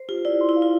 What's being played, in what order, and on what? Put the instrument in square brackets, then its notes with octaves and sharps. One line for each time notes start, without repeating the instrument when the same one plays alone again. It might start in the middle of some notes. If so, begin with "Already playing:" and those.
Already playing: [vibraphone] C5
[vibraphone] F4 [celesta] G4
[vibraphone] E4 [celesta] D5
[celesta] C6
[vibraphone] E4
[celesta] F5
[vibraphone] F4